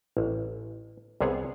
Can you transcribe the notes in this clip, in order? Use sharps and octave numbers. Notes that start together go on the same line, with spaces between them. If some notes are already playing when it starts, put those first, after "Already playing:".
A1
C2 C3 B3 G#4 C#5 F#5